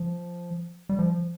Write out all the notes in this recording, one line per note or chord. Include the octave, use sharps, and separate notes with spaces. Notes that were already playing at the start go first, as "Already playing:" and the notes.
Already playing: F3
G3
F3